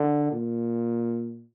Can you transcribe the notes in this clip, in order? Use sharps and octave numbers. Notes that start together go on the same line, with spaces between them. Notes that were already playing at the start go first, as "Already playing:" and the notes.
Already playing: D3
A#2